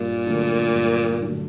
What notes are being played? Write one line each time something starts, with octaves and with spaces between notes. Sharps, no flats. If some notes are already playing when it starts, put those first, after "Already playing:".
Already playing: G2 A#2
D3 F#3 A3 D4
G2
D3 F#3 A3 D4